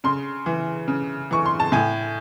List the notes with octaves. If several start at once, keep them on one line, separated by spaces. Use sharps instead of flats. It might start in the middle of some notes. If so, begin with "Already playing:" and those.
C#3 C6
E3
C#3
E3 C#6
C6
A5
A2 G#5